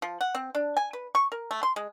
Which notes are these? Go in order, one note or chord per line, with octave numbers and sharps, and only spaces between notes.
F3
F#5
C4
D4
G#5
B4
C#6
A#4
A3
C6
G#3